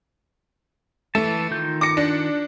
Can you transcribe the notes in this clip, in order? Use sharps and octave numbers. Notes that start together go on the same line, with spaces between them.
E3 A3 A5
D#3 F4 G6
D6 A#6 C#7
D4